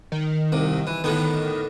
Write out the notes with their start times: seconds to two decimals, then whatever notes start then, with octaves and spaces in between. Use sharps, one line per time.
0.12 D#3
0.52 C2 C3
0.87 E3
1.04 A2 D3 D#3 B3